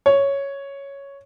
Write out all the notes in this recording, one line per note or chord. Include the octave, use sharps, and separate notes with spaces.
C#5